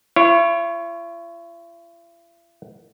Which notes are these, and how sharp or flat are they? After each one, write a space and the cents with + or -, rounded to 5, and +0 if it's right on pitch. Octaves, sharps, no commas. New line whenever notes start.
E4 +45 C#5 -10